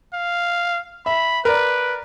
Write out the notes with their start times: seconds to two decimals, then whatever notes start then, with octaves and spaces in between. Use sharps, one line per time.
0.14 F5
1.06 E5 B5
1.45 A#4 B4 D5